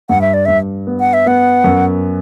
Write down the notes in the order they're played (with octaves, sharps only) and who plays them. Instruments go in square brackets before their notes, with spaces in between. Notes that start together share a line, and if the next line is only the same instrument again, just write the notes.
[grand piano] G2 [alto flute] F#5
[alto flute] E5
D5
[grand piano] G2 [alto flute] E5
[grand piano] B3
[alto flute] F#5
E5
[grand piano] B3 [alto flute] F#5
[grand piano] F#2